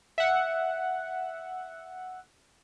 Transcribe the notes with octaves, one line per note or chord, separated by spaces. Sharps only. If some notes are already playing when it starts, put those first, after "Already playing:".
E5 F#5